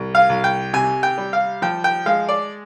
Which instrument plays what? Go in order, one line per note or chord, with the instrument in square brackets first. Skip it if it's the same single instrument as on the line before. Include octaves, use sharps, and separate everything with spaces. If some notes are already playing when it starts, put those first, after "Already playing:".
Already playing: [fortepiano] C2
F5
C2
G5
C3 G#5
G5
G3
F5
F3 G5
G5
G#3 F5
D5